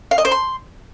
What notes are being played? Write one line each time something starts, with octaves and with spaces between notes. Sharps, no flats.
F5
D#5
C5
C6